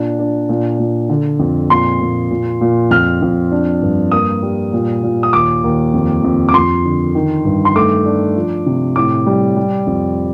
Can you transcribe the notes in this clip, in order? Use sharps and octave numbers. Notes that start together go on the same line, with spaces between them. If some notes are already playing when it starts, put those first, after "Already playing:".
Already playing: A#2 D4
D4
A#2
A#2
D3
F2
A#2 C6
A#2
A#2
A#2
F2 F6
F2
D4
G2
A#3 D#6
G3
A#2
A#2
D#6
D#2 D6
D#2
F2
F2
D6
F2 C6
D3
D#3
G2
C6
A3 D6
D4
F3
C3
A2 D6
G3
G3
F2